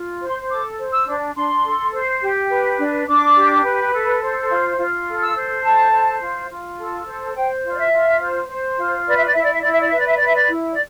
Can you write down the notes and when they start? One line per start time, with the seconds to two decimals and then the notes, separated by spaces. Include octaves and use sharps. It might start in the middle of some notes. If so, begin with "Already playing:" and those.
Already playing: F4
0.21 C5
0.28 C6
0.50 A4 D6
0.78 C5
0.92 E6
1.07 D4
1.35 D4 C6
1.64 A4
1.93 C5
2.22 G4
2.50 B4
2.78 D4
3.07 D4 D6
3.35 G4
3.64 B4
3.93 A4
4.21 C5
4.49 F4
4.78 F4
5.07 A4
5.21 E6
5.35 C5
5.63 A4 A5
5.92 C5
6.21 F4
6.49 F4
6.78 A4
7.06 C5
7.35 C5 G5
7.64 F4
7.72 D5
7.78 E5
7.92 F4
8.21 C5
8.49 C5
8.78 F4
9.06 B4 D5
9.16 E5
9.25 D5
9.34 E4 E5
9.43 D5
9.52 E5
9.61 E4 D5
9.71 E5
9.80 D5
9.89 B4 E5
9.98 D5
10.07 E5
10.16 D5
10.21 B4 E5
10.35 D5
10.49 E4
10.73 D5